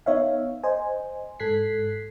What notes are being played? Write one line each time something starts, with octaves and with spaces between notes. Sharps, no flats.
B3 D#4 C#5 E5 F5
C5 D#5 G#5
G#2 A4 F#6 G#6 B6 C7